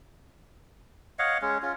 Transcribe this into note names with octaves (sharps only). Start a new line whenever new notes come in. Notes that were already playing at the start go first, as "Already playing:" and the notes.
C#5 D#5 F5 F#5
G#3 C#4
C#4 F4